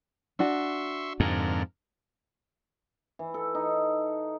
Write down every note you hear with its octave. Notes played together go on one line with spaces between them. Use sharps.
D4 F#4 E5 C6 C#6
F2 G#2 D3 A#4
E3
A4
D#4